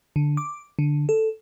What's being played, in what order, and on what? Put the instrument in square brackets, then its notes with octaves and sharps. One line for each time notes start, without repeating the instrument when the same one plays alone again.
[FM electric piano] D3
D6
D3
A4